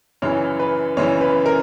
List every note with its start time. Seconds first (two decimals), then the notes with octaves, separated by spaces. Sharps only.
0.22 F#2 C#3 E3 C#5
0.59 B4
0.97 F#2 C#3 E3 C#5
1.21 B4
1.46 A#4